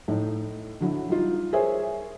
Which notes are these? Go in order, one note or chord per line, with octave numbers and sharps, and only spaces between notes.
A2 D#4
D3 F#3 E4
G3 D#4 F4
G#4 A#4 C5 C#5 E5 G#5